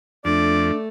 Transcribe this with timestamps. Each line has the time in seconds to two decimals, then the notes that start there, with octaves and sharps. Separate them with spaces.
0.25 F2 A3 D4 D5